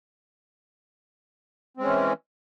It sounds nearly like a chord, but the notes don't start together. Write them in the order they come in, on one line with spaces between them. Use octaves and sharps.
C4 G#3 C#4 E3